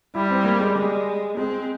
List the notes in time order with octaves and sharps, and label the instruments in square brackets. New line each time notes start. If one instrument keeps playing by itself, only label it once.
[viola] G3 [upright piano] E4
[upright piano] C4
A#3
G#3
[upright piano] G3 [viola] G#3
[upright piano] G#3 [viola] C4